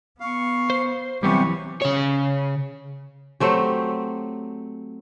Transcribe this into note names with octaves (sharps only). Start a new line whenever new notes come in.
B3 F5 C#6
C5
C3 E3 F#3 G3 B3 C4 G4 C#6
C#3 C#5
F#3 A3 C4 G4